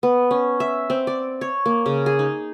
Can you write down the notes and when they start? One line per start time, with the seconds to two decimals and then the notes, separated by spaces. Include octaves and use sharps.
0.03 B3
0.31 C#4
0.60 E5
0.90 C4
1.07 D5
1.41 C#5
1.66 A#3
1.86 C#3
2.06 G#4
2.19 D#4